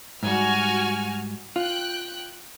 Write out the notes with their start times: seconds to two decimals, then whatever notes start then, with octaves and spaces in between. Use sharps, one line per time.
0.23 G#2 G3 F#4 G#5 F6
1.56 F4 G5 F#6